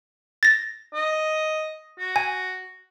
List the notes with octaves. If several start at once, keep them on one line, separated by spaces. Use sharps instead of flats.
A6 A#6
D#5
F#4
G#5